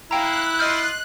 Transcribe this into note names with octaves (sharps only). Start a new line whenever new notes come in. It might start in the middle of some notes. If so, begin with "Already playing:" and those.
A#3 E4 F5 G5 A#5 F#6
F4 D#5 C6 D#6 F6 G6